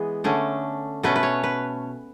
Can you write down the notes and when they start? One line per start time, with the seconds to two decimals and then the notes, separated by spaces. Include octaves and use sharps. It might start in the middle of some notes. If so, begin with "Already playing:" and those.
Already playing: E3 G#3 B3 G#4
0.24 D3 A3 C#4
1.03 B2 A3 C#4 B4
1.16 B4
1.23 C#5
1.44 B4